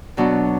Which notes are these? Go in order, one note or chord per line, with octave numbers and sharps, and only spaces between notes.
B2 F#3 B3 D4